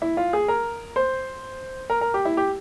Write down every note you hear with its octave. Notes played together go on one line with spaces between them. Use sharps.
E4
F4
G#4
A#4
C5
A#4
A#4
G4
E4
G4